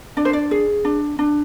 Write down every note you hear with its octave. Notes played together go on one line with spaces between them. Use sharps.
D4 D5
C5
D5
G#4
D4
D4